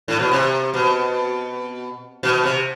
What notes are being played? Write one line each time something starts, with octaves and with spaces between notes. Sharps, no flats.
A2
B2
C3
B2
B2
C3